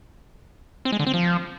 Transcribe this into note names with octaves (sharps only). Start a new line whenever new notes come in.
C4
G#3
D3
C4
F3